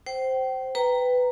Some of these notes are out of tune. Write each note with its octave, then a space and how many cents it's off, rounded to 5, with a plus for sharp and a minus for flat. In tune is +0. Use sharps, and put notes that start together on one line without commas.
C5 +0 G5 -35
B4 +15 G5 +0 A#5 +0